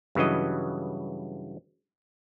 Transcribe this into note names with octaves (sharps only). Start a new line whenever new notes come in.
G2 C#3 E3 F#3 D#5